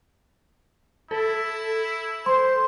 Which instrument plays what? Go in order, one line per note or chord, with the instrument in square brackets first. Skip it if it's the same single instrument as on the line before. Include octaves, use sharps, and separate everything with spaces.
[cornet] E4 [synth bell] A4
[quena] C5 [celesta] C6